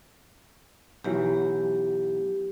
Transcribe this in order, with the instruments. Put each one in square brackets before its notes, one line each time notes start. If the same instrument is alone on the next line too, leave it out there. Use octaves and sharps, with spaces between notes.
[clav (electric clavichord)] B1 E3 F#3 [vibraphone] G4